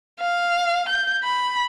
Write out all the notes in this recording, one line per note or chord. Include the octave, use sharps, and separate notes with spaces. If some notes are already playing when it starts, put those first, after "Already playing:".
F5
G6
B5